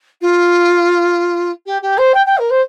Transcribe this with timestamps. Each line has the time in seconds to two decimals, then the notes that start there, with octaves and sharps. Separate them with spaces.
0.21 F4
1.66 G4
1.82 G4
1.97 C5
2.14 G5
2.26 G5
2.38 A#4
2.50 C5